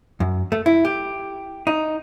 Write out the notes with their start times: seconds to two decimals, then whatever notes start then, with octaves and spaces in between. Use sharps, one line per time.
0.20 F#2
0.52 A3
0.66 E4
0.85 G4
1.67 D#4